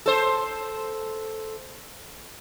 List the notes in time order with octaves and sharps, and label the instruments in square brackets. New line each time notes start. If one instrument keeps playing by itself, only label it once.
[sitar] A4 C5